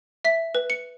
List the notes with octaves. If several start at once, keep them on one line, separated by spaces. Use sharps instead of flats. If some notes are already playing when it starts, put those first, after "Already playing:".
E5 B6
B4
C#7